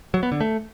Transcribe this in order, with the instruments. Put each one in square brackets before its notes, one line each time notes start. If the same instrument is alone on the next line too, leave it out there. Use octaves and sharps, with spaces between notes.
[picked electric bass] F#3
B3
D3
A3